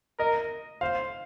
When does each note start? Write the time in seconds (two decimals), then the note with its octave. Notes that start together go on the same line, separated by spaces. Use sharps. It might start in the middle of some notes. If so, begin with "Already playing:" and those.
0.19 A#4 D#5
0.81 C5 F5